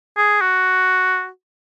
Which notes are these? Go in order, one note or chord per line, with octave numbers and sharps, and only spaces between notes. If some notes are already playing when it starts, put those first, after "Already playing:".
G#4
F#4